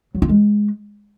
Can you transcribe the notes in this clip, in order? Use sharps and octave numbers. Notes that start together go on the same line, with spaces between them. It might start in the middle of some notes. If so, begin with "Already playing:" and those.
F#3
F4
G#3